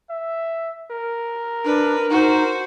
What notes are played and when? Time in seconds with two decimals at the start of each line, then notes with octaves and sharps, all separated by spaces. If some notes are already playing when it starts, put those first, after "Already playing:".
0.10 E5
0.91 A#4
1.65 D4 B4
2.10 D#4 F#4 C5